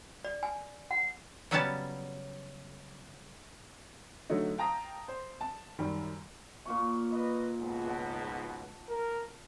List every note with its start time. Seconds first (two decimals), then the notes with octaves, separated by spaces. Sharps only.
0.25 D5
0.43 G#5
0.91 F#5
1.51 C#3 F#3 G3 B3 C#4 A5
4.30 D3 F#3 A3 D#4
4.58 F5 G5 A5 A#5 D#6 A#6
5.08 C5
5.41 A5
5.79 F#2 D#3 G3
6.65 A#2 F4 C#6
7.11 B4 D#5
7.58 C#2 G#2 B2
7.86 F#5 A5
8.88 A#4